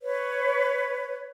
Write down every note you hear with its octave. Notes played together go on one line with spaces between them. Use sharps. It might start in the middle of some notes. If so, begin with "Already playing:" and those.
B4 C#5